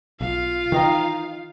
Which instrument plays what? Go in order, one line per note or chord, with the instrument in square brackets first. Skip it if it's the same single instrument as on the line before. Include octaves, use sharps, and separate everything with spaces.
[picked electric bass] B1 [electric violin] F4 F5
[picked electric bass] D#3 E3 [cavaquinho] D#4 D#5 G5